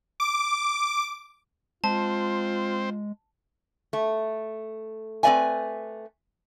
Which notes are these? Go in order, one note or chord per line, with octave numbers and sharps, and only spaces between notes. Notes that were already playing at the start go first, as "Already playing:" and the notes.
D6
G#3 C4 F4 C5 A5
A3
A3 C4 B4 D5 E5 G#5